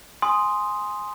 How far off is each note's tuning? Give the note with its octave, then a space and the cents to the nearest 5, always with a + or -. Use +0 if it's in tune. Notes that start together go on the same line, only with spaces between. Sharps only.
G#5 +0 C6 +0 D#6 +0